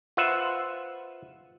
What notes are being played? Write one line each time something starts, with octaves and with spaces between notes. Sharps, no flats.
F4 B4 C5 E5 F#5